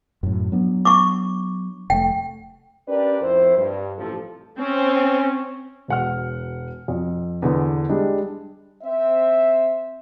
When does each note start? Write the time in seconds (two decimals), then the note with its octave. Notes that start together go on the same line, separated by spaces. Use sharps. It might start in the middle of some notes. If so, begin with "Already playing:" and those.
0.23 F#2 A2
0.52 F#3 B3 D4
0.85 C#6 D6
1.90 F1 A2 A3 G5
2.88 C#4 D4 G4 A#4 B4 D5
3.21 F2 A2 E4 C5
3.57 G2
3.98 A1 C3 F3 A4
4.59 C4 C#4
5.88 E1 F#5 F6
6.88 F2
7.42 E2 D3 B3
7.89 G3 G#3 D4
8.83 C4 E5